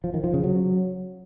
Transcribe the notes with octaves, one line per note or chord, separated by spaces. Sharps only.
F3
D#3
F3
C#3
F#3